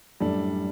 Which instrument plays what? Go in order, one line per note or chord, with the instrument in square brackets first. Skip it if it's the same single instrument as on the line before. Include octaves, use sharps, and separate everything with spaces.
[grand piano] F#2 A2 [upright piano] G3 D4 A4